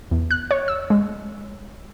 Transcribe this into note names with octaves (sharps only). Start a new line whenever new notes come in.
E2
F#6
C#5
E6
G#3